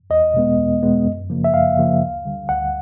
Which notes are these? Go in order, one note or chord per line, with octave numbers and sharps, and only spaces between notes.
E2 D#5
B2 G#3 B3
E2
B2 G#3 B3
F#2
C#3 F3 A#3
E5
F#2 F5
C#3 F3 A#3
D2
D3 G3
D2 F#5